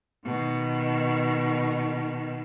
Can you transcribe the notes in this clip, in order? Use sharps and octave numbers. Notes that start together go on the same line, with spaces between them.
B2 D#3